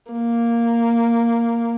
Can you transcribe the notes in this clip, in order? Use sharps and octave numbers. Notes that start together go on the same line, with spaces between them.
A#3